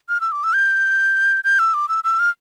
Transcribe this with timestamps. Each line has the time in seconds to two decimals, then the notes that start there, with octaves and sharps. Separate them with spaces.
0.09 F6
0.21 E6
0.32 D6
0.44 E6
0.54 G6
1.44 G6
1.59 E6
1.74 D6
1.89 E6
2.04 E6
2.19 F6